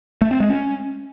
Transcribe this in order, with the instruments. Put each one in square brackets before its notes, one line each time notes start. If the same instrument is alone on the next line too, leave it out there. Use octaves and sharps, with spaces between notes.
[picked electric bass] A3
C4
G#3
C#4